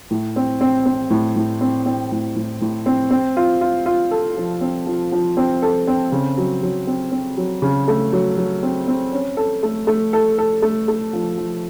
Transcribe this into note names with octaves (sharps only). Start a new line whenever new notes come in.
A2
C4
C4
C4
A2
A2
C4
C4
A2
A2
A2
C4
C4
F4
F4
F4
A4
F3
C4
F3
F3
C4
A4
C4
C#3
F#3
F#3
C4
C4
F#3
C#3
A3
F#3
F#3
C4
C4
C#4
A4
A3
A3
A4
A4
A3
A3
F3
F3